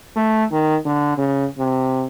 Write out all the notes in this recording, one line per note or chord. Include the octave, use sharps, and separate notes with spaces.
A3
D#3
D3
C#3
C3